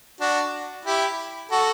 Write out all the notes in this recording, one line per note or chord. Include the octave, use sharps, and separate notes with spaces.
D4 F#4
E4 G4
F#4 A4